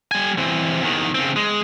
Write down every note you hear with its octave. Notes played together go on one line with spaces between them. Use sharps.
G3 G#5
E3 C4
E2 D#3
C#3 C4
G#3